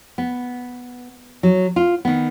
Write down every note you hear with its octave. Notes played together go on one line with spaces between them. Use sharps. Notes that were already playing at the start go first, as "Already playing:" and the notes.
B3
F#3
F4
D#3 B3